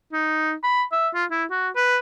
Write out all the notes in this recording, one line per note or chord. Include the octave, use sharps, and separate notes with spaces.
D#4
B5
E5
F4
E4
F#4
B4